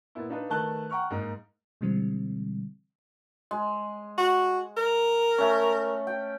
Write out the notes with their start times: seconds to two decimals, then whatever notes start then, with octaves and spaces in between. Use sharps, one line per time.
0.15 A#2 B3 E4
0.29 D4 D#4 F4 B4
0.50 D#3 A3 B4 A5 F#6 G7
0.90 F#5 G5 A#5 C#6 F6
1.10 G#2 A#3 D#4
1.81 B2 D3 E3 G3 G#3 C4
3.51 G#3
4.18 F#4
4.77 A#4
5.38 A3 C#4
6.07 G5